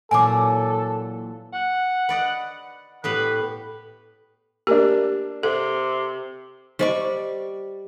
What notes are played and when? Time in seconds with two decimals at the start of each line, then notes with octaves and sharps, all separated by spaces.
0.11 A#2 E3 F#3 A4 G#5 D6
1.53 F#5
2.09 B4 D5 D#5
3.04 A2 B3 G4 B4
4.67 A#3 D4 G4
5.43 C3 A4
6.79 G3 G4 C5 D5 D#5 C#6